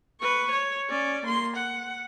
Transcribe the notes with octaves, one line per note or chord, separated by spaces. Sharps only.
B4 C#6
C#5
C#4 D5
A#3 C6
F#5